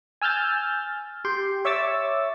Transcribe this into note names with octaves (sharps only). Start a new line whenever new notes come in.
G#5 E6 F6 G6 A6
G4 G5 C6
C#5 E5 C#6 D6 E6 A6